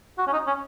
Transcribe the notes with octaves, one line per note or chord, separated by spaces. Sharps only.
F#4
C#4
D#4
C#4